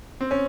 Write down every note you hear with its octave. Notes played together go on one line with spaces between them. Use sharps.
C4
C#4